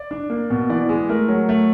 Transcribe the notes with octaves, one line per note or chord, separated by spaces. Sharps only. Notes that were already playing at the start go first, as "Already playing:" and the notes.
Already playing: D5
D4
A#3
B2
E3 D5
G#3
A3 A#4
F#3
A3